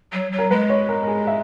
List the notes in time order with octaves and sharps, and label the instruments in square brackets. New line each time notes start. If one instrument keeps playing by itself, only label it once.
[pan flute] F#3
F#3
[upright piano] A#4
[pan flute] G#3 [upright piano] B4
[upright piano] C#5
A#4
A#4
G#4
E5